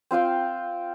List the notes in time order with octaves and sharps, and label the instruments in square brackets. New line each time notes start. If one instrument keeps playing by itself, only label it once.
[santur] C4 F4 F5 G5